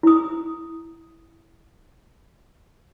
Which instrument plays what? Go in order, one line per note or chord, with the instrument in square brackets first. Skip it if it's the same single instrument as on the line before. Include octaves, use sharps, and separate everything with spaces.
[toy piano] E4 D#6